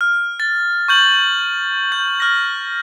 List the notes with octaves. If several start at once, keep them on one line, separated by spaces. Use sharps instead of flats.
F6
A6
C#6 G6 F#7
G6
F6 A#6